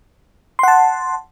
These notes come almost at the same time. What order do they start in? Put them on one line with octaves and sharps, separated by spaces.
C6 F#5 A5